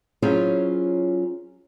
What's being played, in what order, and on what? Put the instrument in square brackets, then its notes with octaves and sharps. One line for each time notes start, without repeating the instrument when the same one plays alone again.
[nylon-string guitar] F#3 C#4 E4 F4 G#4 C5